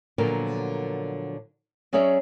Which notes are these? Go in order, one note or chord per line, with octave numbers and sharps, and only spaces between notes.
A#2 D3 F3 F#3 B3 A#4
F#3 C#4 G#4 C#5 D5 E5